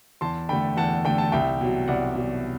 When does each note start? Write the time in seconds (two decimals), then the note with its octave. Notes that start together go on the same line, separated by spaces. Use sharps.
0.21 E2 A5 C6
0.49 D3 A3 G5 B5
0.77 E2 F#5 A5
1.05 D3 A3 G5
1.18 A5
1.32 C2 E5 G5
1.61 B2 F#3
1.88 C2 D5 F#5
2.16 B2 F#3